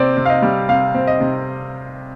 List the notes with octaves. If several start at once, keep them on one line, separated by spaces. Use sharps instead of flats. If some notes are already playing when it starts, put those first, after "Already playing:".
Already playing: C3 C4 D5
C3
F5
D#5
G3
C3 F5
C4
D#5
C3